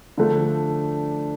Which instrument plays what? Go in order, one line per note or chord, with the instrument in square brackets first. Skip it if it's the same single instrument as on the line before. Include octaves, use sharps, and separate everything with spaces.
[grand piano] D3 F3 A3 D4